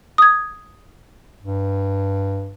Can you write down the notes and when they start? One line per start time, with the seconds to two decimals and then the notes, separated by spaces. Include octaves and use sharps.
0.18 D#6 G#6
1.43 G2